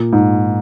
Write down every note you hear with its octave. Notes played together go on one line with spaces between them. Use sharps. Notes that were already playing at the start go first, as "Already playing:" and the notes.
Already playing: A#2
G#2